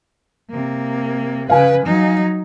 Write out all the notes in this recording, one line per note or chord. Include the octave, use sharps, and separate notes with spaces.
C3 A#3
C#3 B4 F5 G#5
F#3 D#4